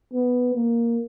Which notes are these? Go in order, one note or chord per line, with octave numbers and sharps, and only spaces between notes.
B3
A#3